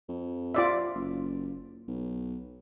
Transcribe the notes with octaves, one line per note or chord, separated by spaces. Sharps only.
F2
F4 D5 E5
F#1
B1